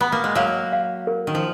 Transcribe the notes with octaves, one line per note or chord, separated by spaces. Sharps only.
B3 B5
A#3
G#3
F#3 A#3 F5
F5
A#4
D#3
F3